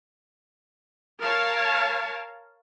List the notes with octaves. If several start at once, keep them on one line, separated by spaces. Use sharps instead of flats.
A#4 C#5 F5 A5